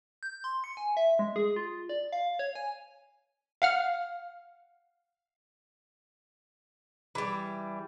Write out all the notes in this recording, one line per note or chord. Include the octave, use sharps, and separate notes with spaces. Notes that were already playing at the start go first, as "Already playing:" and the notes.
G6
C6
C#7
G#5
E5
G#3
G#4
F4
D5
F5
C#5
G#5
F5 F#5 F6
E3 G3